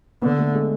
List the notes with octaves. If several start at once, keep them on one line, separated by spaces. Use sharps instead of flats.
D3 B3
A3
G#3